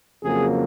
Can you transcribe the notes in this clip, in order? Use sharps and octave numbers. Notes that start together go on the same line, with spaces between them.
F2 C#3 F#3 A#3 G#4